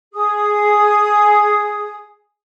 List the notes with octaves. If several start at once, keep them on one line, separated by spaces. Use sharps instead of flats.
G#4 D#6